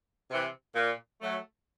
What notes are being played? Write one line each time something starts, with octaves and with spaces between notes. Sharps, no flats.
C3 E3
A#2
F#3 A3